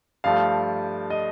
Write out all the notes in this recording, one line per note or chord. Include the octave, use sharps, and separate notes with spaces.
G2 F3 A3 F5
D#5